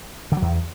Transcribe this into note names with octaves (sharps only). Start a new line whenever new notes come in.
D3
F#3
E2